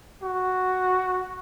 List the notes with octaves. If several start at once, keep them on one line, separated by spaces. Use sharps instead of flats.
F#4